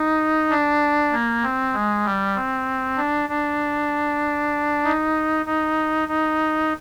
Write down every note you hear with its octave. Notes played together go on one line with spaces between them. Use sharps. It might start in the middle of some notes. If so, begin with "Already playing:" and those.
Already playing: D#4
D4
A#3
C4
G#3
G3
C4
D4
D4
D#4
D#4
D#4